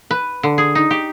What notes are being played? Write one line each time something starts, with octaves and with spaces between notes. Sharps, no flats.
B4
D3
G#4
D#4
G4